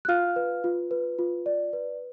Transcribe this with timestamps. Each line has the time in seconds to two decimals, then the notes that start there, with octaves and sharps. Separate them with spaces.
0.05 F#6
0.08 F4 F5 F6
0.36 B4
0.64 F4
0.91 B4
1.19 F4
1.46 D5
1.73 B4